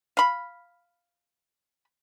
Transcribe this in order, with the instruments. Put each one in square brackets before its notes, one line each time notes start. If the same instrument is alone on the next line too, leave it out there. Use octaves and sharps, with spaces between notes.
[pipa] F5 B5